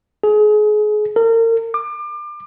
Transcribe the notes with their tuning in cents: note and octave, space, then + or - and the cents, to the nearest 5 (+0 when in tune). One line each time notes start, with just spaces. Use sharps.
G#4 +30
A#4 -35
D6 +30